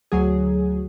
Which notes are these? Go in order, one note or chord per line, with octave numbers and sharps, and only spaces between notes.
D2 F#3 G#4